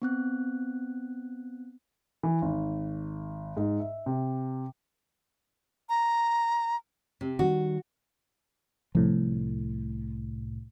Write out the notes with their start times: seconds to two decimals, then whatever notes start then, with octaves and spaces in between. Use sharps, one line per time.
0.02 B3 C4 F#6
2.23 E3
2.42 G#1
3.57 G#2
3.80 E5
4.06 C3
5.89 A#5
7.21 C3
7.39 D#3 E3 G3 F#4
8.95 C2 A2 F3